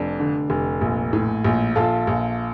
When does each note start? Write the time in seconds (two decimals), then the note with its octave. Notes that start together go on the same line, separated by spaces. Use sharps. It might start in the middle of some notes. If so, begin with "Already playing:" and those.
Already playing: F1 F2 D4
0.20 D3
0.50 F1
0.81 A#1
1.13 A2
1.45 A#1
1.76 A#1 F4 A4
2.07 A#1